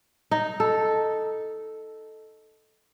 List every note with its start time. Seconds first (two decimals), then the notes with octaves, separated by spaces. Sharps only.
0.31 D#4
0.60 A4